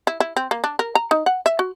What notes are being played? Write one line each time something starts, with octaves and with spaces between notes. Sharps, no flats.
E4
E4
C4
A#3
D4
A#4
A#5
D#4
F#5
E5
F#4